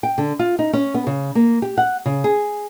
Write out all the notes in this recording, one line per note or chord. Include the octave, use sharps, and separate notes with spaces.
G5
D3
F4
D#4
C#4
B3
C#3
A#3
G4
F#5
C#3
G#4